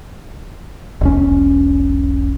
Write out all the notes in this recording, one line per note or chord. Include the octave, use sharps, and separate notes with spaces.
E1 B1 C#4